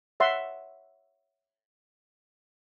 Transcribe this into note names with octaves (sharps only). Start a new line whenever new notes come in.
C#5 E5 F#5 C6